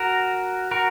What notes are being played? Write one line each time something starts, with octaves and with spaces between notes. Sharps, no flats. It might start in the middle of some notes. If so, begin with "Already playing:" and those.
Already playing: F#4 A#4
F#4 A#4